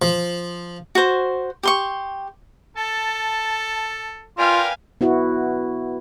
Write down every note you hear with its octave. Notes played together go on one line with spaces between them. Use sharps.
F3
F#4 C5
G4 C6 C#6
A4 A5
F4 A#4 B4 D5 F5 G5 G#5
B3 E4 F#4